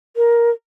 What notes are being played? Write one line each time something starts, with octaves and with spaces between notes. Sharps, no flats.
A#4